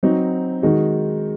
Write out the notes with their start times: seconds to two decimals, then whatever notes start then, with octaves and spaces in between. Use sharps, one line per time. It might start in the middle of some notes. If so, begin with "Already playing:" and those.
0.03 F#3 C4 D#4 F#4
0.62 D#3 G#3 D#4 F#4